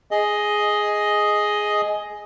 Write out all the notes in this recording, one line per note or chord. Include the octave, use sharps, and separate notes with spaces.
G#4 D#5